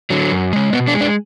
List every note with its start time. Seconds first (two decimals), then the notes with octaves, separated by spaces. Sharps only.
0.10 D3 F#3
0.31 F#2
0.53 C#3 G#3
0.73 B2 B3
0.87 D4
0.94 G#3
1.01 D4